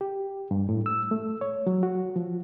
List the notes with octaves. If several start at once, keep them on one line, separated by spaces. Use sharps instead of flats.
G4
G2
A2
E6
A3
C#5
F#3
F#4
F3